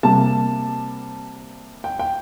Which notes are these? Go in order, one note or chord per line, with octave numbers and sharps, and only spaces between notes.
C3 G3 A#3 A5
G5
G5